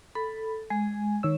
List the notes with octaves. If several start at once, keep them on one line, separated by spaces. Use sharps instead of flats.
A4 B5
G#3 G#5
D#3 C#5 E6